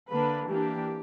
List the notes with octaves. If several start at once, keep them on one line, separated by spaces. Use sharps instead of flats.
D3 A#3 D4 B4
E3 A#3 D4 G4